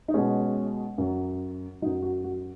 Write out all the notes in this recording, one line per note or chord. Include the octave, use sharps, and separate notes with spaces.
D#4
B2 G#3 C#4
F#2 F#3
F#2 F#3 D#4
F#4
F#4